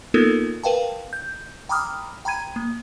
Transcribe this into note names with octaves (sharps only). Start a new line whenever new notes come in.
A#3 B3 D#4 F4 A4 A#4
A#4 B4 F5 G5 A5
G6
G5 A#5 B5 D6 D#6 F6
G5 A#5 B5 G#6 D#7
A#3